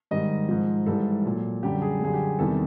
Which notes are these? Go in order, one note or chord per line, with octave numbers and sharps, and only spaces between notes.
G#2 D#3 G3 D#5
G#2 F3
G#2 E3 G3 A4
A#2 F#3
F#2 D3 G3 G4
G#4
F#2 D3 G3 G#4
G4
E2 C3 D#3 G3 A4